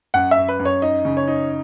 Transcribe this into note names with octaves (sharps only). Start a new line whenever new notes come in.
F#2 F#5
E5
F#2
B4
F#2
C#5
D#4 D#5
C#3
C#5
D#4